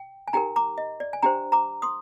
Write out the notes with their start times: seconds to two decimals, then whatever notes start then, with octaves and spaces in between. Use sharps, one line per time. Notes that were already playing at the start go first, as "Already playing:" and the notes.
Already playing: G5
0.28 G#5
0.33 D#4 G4 A#4 G5 A#5
0.56 A#5 D6
0.78 D#5
1.00 D5
1.13 G#5
1.22 D4 G4 C5 G5 A#5
1.52 A#5 D6
1.82 C6 D#6